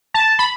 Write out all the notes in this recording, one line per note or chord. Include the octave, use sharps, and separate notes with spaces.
A5
B5